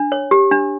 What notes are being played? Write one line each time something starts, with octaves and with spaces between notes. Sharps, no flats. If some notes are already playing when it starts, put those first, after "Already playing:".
Already playing: D4
C#5
G4
D4